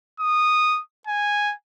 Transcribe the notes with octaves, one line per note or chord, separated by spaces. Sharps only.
D#6
G#5